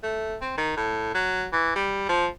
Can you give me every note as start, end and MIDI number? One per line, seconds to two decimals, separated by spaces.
0.03 0.36 57
0.41 0.53 60
0.58 0.73 51
0.77 1.11 45
1.14 1.46 54
1.53 1.73 52
1.76 2.04 55
2.09 2.27 53